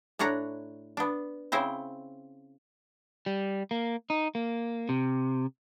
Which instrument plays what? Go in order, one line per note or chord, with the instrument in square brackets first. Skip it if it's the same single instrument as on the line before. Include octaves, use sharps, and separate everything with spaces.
[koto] A2 D4 C#5 F#5 A#5
B3 D4
C#3 C4 E4 C5
[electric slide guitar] G3
A#3
D#4
A#3
C3